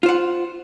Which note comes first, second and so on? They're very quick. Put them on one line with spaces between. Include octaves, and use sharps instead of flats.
F4 C5 F#5